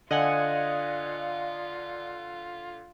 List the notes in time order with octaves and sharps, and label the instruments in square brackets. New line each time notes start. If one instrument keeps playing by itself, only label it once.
[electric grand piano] D3 [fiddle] F4 [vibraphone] D5 F5 [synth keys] D#5 F#5 G#5